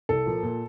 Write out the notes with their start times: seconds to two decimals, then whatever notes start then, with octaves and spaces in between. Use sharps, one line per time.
0.09 C2 A4
0.26 A#2 F3 A#3
0.43 A#2